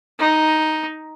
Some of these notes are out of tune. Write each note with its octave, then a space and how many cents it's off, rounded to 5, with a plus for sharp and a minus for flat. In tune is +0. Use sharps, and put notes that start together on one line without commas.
D#4 +5